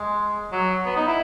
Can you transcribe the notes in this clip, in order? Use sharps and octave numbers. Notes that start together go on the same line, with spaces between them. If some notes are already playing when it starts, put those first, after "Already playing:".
Already playing: G#3
F#3
B3
D#4
E4